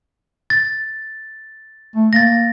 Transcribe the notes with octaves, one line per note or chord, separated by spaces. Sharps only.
A6
A3
A#3 A6 A#6